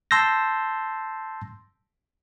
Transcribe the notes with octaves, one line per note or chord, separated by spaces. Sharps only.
A5 C6 E6 G6 A#6